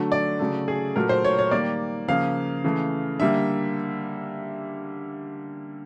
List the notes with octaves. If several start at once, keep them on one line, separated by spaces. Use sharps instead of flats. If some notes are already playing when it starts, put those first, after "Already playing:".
Already playing: D3 F#3 A3
D5
C#3 F#3 A3
G#4
A#2 F#3 A3 A#4
C5
C#5
C#5
D#3 G3 A#3 D5
C#3 F3 A#3 F5
C#3 E3 A3
D3 G3 A#3 E5